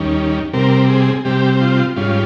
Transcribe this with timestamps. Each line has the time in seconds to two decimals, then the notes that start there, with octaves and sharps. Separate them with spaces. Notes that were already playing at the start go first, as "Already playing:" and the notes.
Already playing: D#2 D#3 G3 C#4
0.53 C3 G3 C4 A#4
0.89 G#4
1.25 C3 G3 C4 G4
1.61 F4
1.96 G#2 G3 C#4 F4